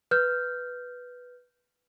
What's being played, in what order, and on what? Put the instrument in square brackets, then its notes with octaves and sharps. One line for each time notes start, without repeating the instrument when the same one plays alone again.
[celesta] B4 F6 G6